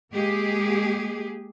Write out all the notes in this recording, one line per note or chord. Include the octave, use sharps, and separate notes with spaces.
G#3 A#3 G4 G#4